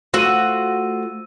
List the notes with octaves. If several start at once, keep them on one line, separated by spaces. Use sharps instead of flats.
A3 F4 F#4 C5 E6 D#7